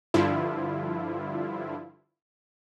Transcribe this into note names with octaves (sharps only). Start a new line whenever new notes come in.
G2 D3 F3 E4 F4